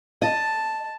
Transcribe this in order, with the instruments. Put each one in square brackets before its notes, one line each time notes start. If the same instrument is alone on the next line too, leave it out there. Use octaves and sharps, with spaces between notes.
[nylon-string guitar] D#5 [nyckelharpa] A5